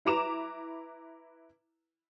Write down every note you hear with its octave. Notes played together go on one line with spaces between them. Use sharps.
E4 B4 A#5 D6 E7 F7